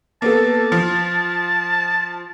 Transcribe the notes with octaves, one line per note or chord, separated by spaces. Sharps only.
A#3 B3 A4 A5
F3